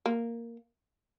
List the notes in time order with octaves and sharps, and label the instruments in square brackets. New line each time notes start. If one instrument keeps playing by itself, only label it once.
[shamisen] A#3